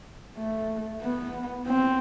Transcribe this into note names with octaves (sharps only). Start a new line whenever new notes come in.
A3
B3
C4